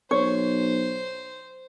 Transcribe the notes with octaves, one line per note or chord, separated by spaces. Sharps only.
B1 C5 C#5